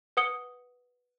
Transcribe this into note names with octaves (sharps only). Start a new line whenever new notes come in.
B4 F#5 D#6 C#7 G7